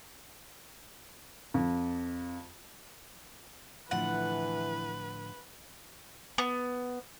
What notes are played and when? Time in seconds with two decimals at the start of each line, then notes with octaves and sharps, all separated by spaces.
1.54 F2
3.91 A2 D3 E3 F3 B4 F#5
6.38 B3